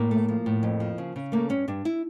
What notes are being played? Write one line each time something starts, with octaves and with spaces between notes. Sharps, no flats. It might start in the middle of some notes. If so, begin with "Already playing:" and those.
Already playing: A2 A#3
A3
F3
A2
F2
F3
C#3
C#3
A3 A#3
G2 C#4
G2 D4
E4